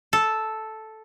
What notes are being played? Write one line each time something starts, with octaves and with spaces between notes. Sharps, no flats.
A4